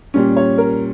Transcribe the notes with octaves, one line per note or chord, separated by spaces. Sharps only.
A#2 G3 C#4
C#5
A#4